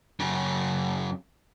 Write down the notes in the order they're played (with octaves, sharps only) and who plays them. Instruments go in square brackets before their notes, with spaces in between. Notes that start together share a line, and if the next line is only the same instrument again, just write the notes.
[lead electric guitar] F#2 C#3